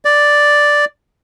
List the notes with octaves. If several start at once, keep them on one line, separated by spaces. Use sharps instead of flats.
D5